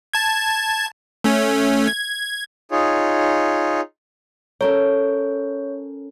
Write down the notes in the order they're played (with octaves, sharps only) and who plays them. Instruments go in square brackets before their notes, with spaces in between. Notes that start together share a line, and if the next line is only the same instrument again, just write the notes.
[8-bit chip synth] A5 G#6
A3 C#4
G#6
[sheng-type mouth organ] D#4 F4 G#4 C#5
[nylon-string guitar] C#4 A4 A#4 [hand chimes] C#5